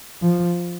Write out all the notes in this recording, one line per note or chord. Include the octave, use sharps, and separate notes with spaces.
F3